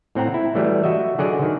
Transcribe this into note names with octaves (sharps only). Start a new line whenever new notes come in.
A2 C4 F#5 A#5
E4
E3 F#3 G3 A3
F#4 D#5 E5
D3 F#3 F#4 G#4 D5
D#3